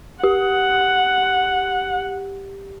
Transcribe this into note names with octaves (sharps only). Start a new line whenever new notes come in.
G4 F#5